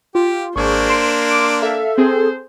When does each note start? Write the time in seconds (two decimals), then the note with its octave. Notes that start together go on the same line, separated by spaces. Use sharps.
0.15 F4 G4
0.56 G#1 A#3 D4 G#4 C5 C#6
0.89 C6 C7 D7 E7
1.29 D6
1.63 A4 E5 F5
1.98 C4 G#4 C5